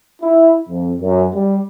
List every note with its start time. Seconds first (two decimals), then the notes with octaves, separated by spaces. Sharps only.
0.22 E4
0.69 F2
1.01 F#2
1.35 G3